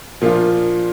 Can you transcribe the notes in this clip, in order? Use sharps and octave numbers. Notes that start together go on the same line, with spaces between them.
A#2 F3 A#3 D4 F4